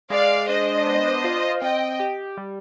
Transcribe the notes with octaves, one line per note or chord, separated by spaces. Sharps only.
G#3 D5 F5
D4 C5 D#5
B3
F4
C4 D#5 G5
G4
G3